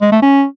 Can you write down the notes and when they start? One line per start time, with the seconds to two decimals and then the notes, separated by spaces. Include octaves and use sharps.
0.01 G#3
0.12 A3
0.22 C#4